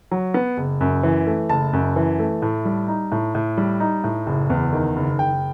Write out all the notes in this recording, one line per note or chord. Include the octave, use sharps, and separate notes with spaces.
F#3
B3
F#1
F#2
E3
A3
F#1 A5
F#2
E3
A3
A2
G3
D#4
A2
A2
G3
D#4
A2
F#1
E2
D#3
F#1
F#1 G5